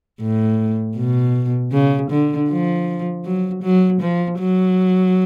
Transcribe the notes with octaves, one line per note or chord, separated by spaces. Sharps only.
A2
B2
C#3
D3
F3
F#3
F#3
F3
F#3